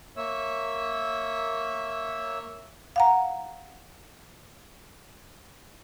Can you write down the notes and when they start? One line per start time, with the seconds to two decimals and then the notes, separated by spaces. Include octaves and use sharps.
0.17 A#3 C#5 E5 E6
2.96 F5 F#5 A#5